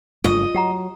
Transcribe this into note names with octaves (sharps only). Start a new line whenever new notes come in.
F#1 G2 A3 F4 D#5 D#6
F#3 G4 F#5 A#5